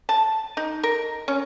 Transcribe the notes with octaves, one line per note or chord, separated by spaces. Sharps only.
A5
D#4
A#4
C#4